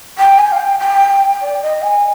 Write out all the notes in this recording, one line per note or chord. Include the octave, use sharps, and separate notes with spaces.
G5
G#5
F5
G5
G5
D5
D#5
G#5